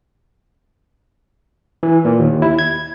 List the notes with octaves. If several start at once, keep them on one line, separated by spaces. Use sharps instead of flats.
E3
A#2
D#2
E4
G#6